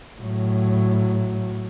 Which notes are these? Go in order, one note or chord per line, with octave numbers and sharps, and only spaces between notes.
A2 F#3